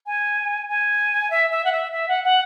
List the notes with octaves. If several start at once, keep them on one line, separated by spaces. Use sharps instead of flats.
G#5
G#5
E5
E5
F#5
E5
E5
F#5
F#5